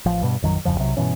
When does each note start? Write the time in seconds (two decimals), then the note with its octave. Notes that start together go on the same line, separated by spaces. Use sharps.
0.06 A1 F3
0.22 G2 B2
0.42 A1 F2 D#3 F#3
0.65 D1 F2 C#3 F3
0.78 B1 C3 F#3
0.97 G2 B2 E3 C#4